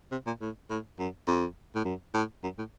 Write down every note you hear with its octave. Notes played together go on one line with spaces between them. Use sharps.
C3
A#2
A2
A2
F#2
F2
A2
F#2
A2
F#2
A2